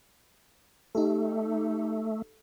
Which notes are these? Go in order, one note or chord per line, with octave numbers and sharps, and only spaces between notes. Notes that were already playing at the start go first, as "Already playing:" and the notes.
A3 D#4 G4 A4